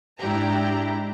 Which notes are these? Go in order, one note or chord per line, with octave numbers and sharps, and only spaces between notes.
G#2 D4 E4 G4 A#5